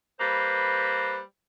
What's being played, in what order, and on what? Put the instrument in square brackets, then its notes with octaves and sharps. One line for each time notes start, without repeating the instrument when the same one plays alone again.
[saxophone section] G3 A#3 B4 C5